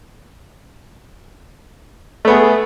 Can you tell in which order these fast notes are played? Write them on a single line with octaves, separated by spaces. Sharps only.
A3 B3 G#4